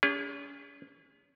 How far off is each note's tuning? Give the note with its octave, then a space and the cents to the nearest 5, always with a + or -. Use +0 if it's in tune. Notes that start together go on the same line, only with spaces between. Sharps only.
C#4 +40 G#4 -30